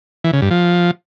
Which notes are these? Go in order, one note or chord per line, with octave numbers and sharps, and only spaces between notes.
E3
C#3
G2
F3